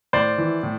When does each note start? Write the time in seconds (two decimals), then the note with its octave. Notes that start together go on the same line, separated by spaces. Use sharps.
0.13 A2 C5 D5
0.38 E3
0.63 A2